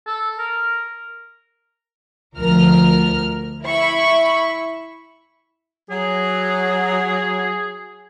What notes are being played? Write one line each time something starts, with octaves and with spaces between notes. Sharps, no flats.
A4
A#4
D2 F3 A#4 F6
E4 E5 B5 C#6
F#3 G#4